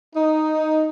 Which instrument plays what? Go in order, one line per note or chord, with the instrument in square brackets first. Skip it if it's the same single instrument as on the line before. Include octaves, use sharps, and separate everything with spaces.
[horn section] D#4